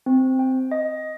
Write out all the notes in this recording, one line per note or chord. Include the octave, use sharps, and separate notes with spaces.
C4
G5
D#5